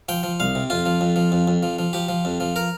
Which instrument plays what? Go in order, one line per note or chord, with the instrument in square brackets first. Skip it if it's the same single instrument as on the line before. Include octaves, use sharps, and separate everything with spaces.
[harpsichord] F3 G5
F3
C2 F5
C3
F2 F4
F3
F2
F3
F2
F2
F3
F3
F3 G4
F3
F2
F3
A#4